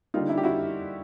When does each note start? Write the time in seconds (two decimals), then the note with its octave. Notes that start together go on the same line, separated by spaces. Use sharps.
0.14 D3 G3 A#3 D#4 F4
0.29 D4 E4
0.37 G4
0.43 E4 F#4